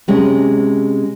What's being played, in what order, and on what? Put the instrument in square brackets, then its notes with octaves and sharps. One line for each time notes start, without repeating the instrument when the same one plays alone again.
[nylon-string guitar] C3 G#3 C#4